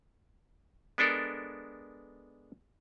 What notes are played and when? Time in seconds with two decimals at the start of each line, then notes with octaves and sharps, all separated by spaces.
0.98 G#3 B3 D4 A4 A#4